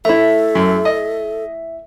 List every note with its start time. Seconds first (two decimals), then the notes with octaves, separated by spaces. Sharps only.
0.05 A3 E4 A4 E5
0.55 F#2
0.85 D#5